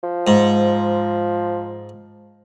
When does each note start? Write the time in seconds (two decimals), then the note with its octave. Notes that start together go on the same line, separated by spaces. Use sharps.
0.03 F3
0.27 G#2